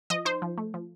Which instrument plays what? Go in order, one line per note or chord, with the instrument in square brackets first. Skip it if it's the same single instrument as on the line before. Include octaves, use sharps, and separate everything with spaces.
[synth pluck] F3 D#5
D#4 C5
F3
A3
F3